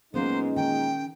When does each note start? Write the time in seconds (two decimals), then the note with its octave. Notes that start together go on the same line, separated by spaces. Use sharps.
0.14 A#2 F#3 G#3 A#3 B3 C#4 D#4 C5
0.56 D#3 G5